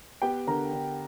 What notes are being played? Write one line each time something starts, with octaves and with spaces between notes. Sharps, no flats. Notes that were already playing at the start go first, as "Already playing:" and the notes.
B3 G4 G5
D3 A#4 A#5
D3